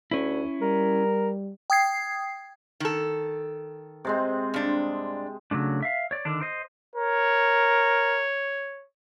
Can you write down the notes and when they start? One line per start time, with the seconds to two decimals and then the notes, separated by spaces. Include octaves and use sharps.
0.11 D2 C#4 E4
0.61 G3 A#4
1.70 G5 D#6 G#6 C7
2.80 D#3 A4
4.05 C3 G#3 C4
4.54 G2 D4
5.51 C#3 F#3 A3 D4
5.83 E5 F5
6.11 C#5 D5
6.25 D3 D#3 D4
6.41 C5 D#5
6.95 A#4 C#5